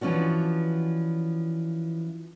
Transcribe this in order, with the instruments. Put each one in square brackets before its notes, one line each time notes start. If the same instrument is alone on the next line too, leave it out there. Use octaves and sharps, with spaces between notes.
[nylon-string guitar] E3 F3 C#4 D4 F#4